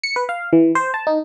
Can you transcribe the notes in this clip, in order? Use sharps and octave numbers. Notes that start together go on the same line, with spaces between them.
C#7
B4
F5
E3
C5
A5
D#4